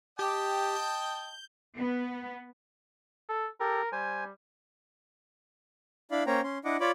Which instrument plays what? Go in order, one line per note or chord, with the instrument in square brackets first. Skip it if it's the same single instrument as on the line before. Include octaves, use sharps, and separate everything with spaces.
[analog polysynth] G4 [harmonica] D#5 G5 A5
[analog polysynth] G6
[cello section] B3
[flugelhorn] A4
[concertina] G4 A4 [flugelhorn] A#4
[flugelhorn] G3 [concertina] C5 G#5
[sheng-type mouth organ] D4 E4 D5 F5 B5
A#3 C#4 C5 C#5 G5 A#5
C#4 C6
D4 E4 D#5 F#5 D6
F4 C#5 D5 B5 D6